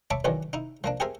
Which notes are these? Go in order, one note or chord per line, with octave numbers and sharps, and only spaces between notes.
C#5 E5 A5 B5 D6
B1 E2 D#3 E3 F#3 D5
D#4 E4
F3 A#3 D4
G4 G#4 A#4 C5 E5 G#5